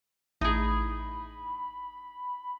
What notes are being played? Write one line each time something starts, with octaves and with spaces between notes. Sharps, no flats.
A1 D#4 G#4 B5